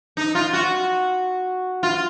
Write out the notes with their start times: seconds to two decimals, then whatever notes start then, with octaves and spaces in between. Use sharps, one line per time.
0.17 D#4
0.35 F4
0.53 F#4
1.83 F4